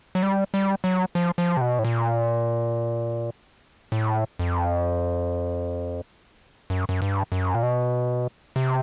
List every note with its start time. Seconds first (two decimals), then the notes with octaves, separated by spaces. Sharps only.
0.15 F#3
0.23 G3
0.54 G3
0.84 F#3
1.15 F3
1.38 F3
1.57 C3
1.61 B2
1.79 A2
1.85 A#2
3.92 A2
4.39 F2
6.70 F#2
6.89 F#2
7.02 G2
7.32 F#2
7.54 A#2
7.63 B2
8.56 C3